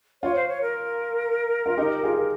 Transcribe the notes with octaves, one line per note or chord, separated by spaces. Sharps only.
F4 C#5
C5
C#5
A#4
F4
D#4 G4
F4 G#4